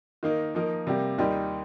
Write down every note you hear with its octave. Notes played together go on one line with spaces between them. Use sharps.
D#3 A#3 D#4
F3 A#3 D#4 A#4
C3 G3 A#3 G4
D#2 D#3 G3 D#4 G4